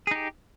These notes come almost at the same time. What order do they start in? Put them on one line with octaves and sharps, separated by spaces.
G#4 D#4 G4